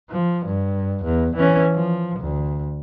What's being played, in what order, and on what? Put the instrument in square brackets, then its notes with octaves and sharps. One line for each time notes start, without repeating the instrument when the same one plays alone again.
[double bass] F3
G2
E2
E3 C#4
F3
D2